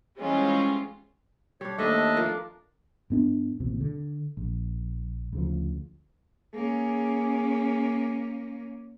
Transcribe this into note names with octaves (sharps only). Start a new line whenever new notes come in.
E3 G3 G#3 C4 C#4 F4
G3 D4 C#5
D#2 A3 C4 D4 D#4 D#5 E5
F3 A#4
G2 B3 D4
A1 D#2 C3
D3
A#1
D2 C#3 F3
A#3 C#4 G#4